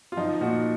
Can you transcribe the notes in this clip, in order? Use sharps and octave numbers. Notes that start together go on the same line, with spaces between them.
F4
F3 D#4
A#2 D#4 F#4